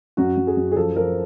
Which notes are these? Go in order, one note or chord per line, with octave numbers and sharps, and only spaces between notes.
F#2 F#4
F#2
G#4
F#2
G#4
F3 A4
F3 A#4